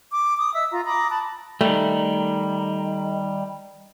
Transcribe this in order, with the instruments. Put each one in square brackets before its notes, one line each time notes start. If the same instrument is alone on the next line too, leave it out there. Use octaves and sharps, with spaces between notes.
[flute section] D6
D6 D#6
D#5 E5 E6
F4 A#5
A#5 B5 D6 D#6
A5 B5 F#6
[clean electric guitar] D#3 G3 [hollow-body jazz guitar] A3